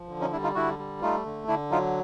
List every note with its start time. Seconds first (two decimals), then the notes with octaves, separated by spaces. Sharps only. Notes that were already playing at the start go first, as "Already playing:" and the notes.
Already playing: F3
0.09 D3
0.21 C#4 D#4
0.32 G3 D4 E4
0.44 D#4 F4
0.55 D3 E4 F#4
0.79 G3
1.02 A3 D#4 F4
1.25 D3
1.48 D3 D4 E4
1.71 F#3 D#4 F4